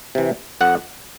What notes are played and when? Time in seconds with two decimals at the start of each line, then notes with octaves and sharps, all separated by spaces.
0.15 C3 E3
0.61 F2 F#5